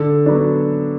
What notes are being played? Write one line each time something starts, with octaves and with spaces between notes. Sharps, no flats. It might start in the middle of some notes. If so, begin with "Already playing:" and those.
Already playing: D3 A4
F#3 B3 D4